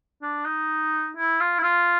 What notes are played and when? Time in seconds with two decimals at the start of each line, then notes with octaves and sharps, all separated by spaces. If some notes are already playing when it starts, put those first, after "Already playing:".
0.22 D4
0.45 D#4
1.17 E4
1.40 F4
1.58 E4
1.63 F4